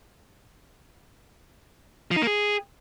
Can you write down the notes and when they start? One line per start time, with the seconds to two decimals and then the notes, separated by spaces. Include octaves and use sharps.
2.11 F3
2.16 D#4
2.22 A#3
2.27 G#4